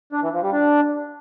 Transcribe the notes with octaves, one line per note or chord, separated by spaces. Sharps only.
D4
E3
F3
G3
D4